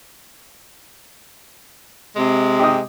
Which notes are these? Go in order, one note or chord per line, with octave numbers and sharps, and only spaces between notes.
C3 G#3
G4 D#5 D#6